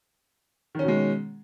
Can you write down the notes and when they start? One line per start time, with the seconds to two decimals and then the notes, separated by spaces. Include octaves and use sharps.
0.75 D#3
0.79 C#4
0.84 B2
0.88 G#3